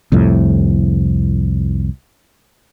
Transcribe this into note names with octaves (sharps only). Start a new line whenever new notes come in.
C2 F2 A2